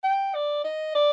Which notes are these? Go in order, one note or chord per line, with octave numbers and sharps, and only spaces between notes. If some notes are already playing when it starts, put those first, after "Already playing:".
G5
D5
D#5
D5